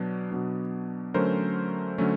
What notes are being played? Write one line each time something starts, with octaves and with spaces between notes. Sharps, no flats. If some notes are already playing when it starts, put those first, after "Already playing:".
Already playing: B2 F#3 B3 D4
B2 F#3 B3 D4
D3 F#3 A3 C#4 A#4 C5
D3 F#3 A3 C#4